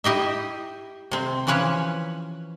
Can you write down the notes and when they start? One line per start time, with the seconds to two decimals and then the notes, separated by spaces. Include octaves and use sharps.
0.04 E4 G4 D#5 E5
1.11 C3 C4
1.47 E3 F3 C#4 B4 C#5